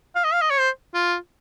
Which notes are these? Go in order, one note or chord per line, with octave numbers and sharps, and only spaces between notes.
F5
D#5
F5
D#5
C#5
C5
F4